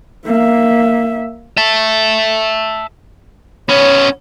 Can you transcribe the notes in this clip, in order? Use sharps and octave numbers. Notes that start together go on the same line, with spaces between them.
A#3 E5
E5 A5
B3 C#4 C#5